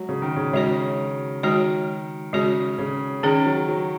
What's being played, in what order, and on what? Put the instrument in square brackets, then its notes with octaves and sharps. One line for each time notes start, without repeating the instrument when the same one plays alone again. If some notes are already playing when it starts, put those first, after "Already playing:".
Already playing: [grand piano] F#3 [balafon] G#3
[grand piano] C#3
D#3
C#3
[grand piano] C#3 [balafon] G#3 F#4 C#5
[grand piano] D#3 [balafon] G#3 F#4 C#5
[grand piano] C#3 [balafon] G#3 F#4 C#5
[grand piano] C#3
[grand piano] D#3 [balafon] C#4 G#4 C#5
[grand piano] F#3
F#3